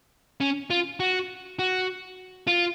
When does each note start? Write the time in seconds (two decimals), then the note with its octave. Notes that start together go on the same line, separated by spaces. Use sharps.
0.41 C#4
0.70 F4
1.00 F#4
1.59 F#4
2.47 F4